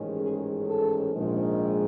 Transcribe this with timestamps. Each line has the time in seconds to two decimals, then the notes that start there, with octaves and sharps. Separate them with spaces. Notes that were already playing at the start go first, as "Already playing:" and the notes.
Already playing: A1 G#2 D#3 G#3 C#4
0.21 G#4
0.67 A4
1.13 A#1 G#2 D#3 G#3